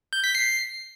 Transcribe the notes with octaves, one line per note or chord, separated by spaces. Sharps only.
G6
B6
C7